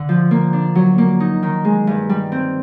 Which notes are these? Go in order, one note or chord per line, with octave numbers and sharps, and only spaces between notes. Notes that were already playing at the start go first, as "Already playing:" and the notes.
Already playing: D3
F3
A#3
D4
F#3
A#3
D#4
D#3
G#3
G2
G3
C4